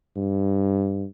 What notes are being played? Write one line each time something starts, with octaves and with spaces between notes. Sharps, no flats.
G2